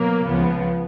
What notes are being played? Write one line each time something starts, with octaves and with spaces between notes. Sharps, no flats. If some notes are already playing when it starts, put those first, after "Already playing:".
Already playing: B2 F#3 A#3
C#2 C#3 F3 B3